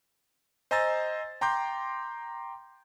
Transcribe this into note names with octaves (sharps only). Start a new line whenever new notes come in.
C5 D#5 G#5 A#5 E6 A6
G5 A#5 C6 D6 G6